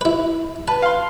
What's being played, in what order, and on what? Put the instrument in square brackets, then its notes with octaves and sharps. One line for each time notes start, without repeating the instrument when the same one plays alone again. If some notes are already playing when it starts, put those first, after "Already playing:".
[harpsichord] E4 B4
[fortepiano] B4 [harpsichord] A5
[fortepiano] F5 C6